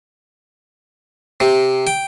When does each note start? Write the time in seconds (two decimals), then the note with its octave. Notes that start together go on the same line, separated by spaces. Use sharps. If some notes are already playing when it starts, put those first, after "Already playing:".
1.40 C3
1.87 G5